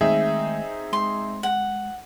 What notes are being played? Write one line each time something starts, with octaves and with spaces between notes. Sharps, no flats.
D#3 G#3 A3 C4 D#4 G#4 E5
G#3 C6
F#5